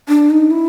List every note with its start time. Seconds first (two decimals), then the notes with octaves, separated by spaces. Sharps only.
0.09 D4
0.30 D#4
0.51 E4